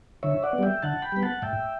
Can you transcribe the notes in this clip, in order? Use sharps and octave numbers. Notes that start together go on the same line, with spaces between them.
D3 C#5 E5
D5 F#5
B3
G3 E5 G5
D3 F#5 A5
G5 B5
G3 B3
F#5 A5
A2 E5 G5